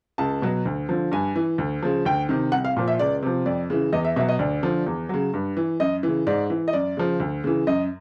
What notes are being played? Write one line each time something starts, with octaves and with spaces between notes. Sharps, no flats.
C#2 A5
B2 F#3
D2
D3 F3
G2 G#5
E3
D2
C#3 F3
D2 G5
C3 D#3
C2 F#5
F5
A#2 F3
E5
C#2 D5
C3 F3
F2 D5
C#3 E3
E2 D#5
E5
B2 F#3 E5
D#5
D2 D5
D3 F3
E2
C#3 F#3
G2
E3
F#2 D#5
C#3 E3
G#2 D5
E3
D#5
F#2 D5
C#3 F3
D2
C#3 E3
F#2 D#5